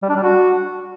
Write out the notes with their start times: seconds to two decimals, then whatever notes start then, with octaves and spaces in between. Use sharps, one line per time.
0.02 G3
0.09 D4
0.16 G3
0.23 F#4